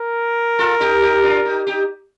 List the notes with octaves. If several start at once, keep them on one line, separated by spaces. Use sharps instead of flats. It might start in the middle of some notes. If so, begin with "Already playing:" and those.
Already playing: A#4
F4 A4
D#4 G4
D#4 G4
D4 F4
D#4 G4
D#4 G4